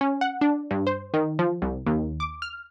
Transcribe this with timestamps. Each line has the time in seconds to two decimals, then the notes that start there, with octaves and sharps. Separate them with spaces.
0.01 C#4
0.21 F#5
0.41 D4
0.71 G2
0.87 C5
1.14 D#3
1.39 F3
1.62 C2
1.86 D#2
2.20 D6
2.42 F6